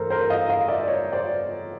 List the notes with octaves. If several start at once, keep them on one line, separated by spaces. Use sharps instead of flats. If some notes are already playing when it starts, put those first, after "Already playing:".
Already playing: G2 E3 A3 A4 A#4 C5
A#4 C5
D#5 F5
D#5 F5
D5 E5
C#5 D#5
C5 D5